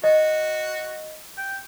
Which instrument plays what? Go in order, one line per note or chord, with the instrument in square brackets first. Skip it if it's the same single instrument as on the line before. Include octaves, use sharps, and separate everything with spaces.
[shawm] F#4 [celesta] D#5
[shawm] G5